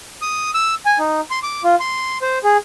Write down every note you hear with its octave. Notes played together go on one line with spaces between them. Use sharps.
D#6
E6
G#5
D#4
C6
D6
F4
C6
C5
G#4